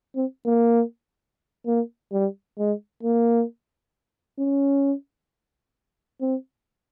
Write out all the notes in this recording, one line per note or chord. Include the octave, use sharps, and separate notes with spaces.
C4
A#3
A#3
G3
G#3
A#3
C#4
C4